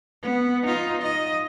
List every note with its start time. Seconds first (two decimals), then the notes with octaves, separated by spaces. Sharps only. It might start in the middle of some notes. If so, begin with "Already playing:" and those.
0.23 B3
0.66 D#4 F4
1.02 D#5